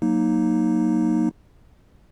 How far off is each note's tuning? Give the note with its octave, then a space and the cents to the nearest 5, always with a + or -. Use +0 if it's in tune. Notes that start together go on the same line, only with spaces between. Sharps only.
F#3 +0 A#3 +10 D#4 +0